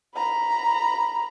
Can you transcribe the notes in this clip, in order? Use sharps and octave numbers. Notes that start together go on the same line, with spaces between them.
A#5 B5